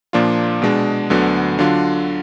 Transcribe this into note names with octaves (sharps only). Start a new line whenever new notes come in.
A#2 F3 A#3 D4 F4
B2 G#3 D4
D2 D3 F#3 B3
D3 F#3 D4 F4